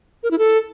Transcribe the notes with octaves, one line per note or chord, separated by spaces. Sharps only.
A#4
E4
A4